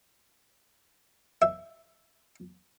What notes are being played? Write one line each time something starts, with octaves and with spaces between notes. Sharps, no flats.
E5